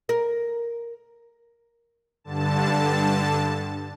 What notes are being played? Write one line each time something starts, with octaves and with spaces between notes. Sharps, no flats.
A#4
G2 D3 A5